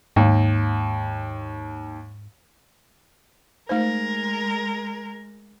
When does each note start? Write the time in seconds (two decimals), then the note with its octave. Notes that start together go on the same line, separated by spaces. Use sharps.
0.16 D#2 G#2
3.69 G#3 A3 D#4 A#4 C5